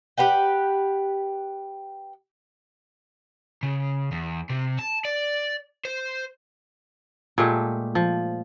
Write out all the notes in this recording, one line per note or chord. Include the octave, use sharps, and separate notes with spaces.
G4 B4 F#5 G5
C#3
E2
C3
A5
D5
C5
A#2 G#3 A3 G4
F3